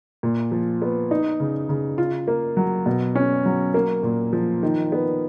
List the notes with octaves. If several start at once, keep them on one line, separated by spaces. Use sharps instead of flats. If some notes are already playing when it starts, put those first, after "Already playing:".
A#2
F3
B3
D#4
C#3
C#3
F4
A#3
F#3
B2
C#4
F#3
A#3
A#2
F3
D#3
B3